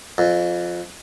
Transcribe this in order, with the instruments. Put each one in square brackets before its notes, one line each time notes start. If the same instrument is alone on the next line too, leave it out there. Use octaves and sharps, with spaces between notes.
[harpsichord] F2